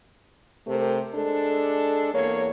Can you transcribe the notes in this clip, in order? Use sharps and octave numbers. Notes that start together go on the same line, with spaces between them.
C3 A3 G4 A#4 C5
G#3 D4 A4
E2 A#3 C#5